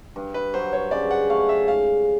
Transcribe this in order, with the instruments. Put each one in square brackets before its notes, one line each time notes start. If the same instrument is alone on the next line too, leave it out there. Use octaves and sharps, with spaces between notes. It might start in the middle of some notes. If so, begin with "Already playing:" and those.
[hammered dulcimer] G2
[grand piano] B4
[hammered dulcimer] F#3 [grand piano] C5
[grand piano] C#5
[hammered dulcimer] C#3 [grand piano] D5
[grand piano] F#5
[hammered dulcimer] A3 [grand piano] F5
[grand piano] E5
[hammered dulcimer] G#2 [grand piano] F5